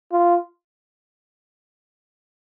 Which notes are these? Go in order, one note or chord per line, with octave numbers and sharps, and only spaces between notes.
F4